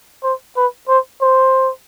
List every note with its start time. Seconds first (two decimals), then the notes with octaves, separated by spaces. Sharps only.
0.23 C5
0.56 B4
0.88 C5
1.21 C5